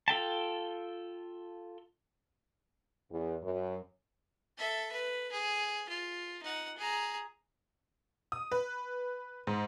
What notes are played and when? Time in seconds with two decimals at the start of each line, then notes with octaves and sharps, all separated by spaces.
0.08 F4 A4 G5 A5
3.10 E2
3.42 F#2
4.58 A4 E5
4.92 B4
5.32 G#4
5.89 F4
6.43 D#4 F#5
6.77 G#4 A#5
8.32 D#6
8.52 B4
9.47 G#2